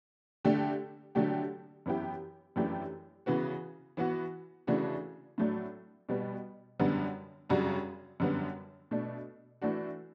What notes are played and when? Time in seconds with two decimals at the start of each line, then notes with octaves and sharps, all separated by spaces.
0.45 D3 A3 D4 G4
1.15 D3 F#3 A3 D4 G4
1.86 F#2 E3 B3 E4 G4
2.56 F#2 E3 A3 D4 G4
3.26 C#3 E3 B3 F#4
3.97 E3 B3 F#4
4.67 C#3 E3 A3 D4 F#4
5.38 A2 F#3 A3 D4
6.09 B2 G3 B3
6.79 F#2 D3 G3 B3
7.49 F#2 C#3 G3 D4 F#4
8.20 F#2 D3 G3 B3
8.91 B2 A3 D4
9.62 E3 A3 D4 F#4